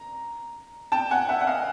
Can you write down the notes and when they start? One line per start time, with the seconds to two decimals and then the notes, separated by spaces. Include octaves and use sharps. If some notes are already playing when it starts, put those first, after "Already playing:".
Already playing: A#5
0.92 G5 A5
1.10 F#5 G#5
1.29 E5 F#5
1.41 F#5
1.47 D#5 F5